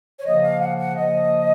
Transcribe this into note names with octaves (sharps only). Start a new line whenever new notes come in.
C#5
C#3 F3 A#3 D#5
F5
F#5
F#5
C#3 F3 A#3 D#5